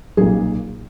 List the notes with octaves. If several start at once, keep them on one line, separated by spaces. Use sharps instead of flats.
B1 A#2 A#3 G#4